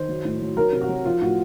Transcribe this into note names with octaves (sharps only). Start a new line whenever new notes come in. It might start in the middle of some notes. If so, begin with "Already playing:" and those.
Already playing: D#3 C5
F#3
A2
F#3
F#3 A#4
C3
F#4
F#3
F3 F4
A2 F#4